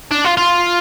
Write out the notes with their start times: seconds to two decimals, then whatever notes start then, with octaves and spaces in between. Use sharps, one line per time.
0.11 D4
0.25 F4
0.37 F4